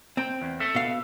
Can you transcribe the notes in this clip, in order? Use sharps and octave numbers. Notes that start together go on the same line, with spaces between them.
C4 G5
E2
A4 E5
B2 F5